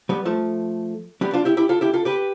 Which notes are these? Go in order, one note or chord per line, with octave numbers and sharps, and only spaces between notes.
G3 B3
F3 A3
G3 B3
D4 F4
E4 G4
E4 G4
F4 A4
E4 G4
F4 A4
G4 B4